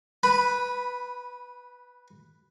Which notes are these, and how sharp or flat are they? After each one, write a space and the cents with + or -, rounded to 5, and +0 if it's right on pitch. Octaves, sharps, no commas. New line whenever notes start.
B4 +0 B5 -20